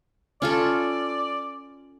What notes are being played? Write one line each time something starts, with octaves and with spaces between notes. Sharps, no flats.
C#4 F4 A4 D5